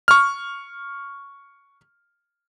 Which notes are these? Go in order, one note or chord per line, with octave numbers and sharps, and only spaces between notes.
C#6 F6